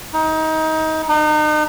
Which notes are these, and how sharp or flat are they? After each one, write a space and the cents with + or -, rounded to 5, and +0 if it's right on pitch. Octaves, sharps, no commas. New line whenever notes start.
D#4 +25
D#4 -35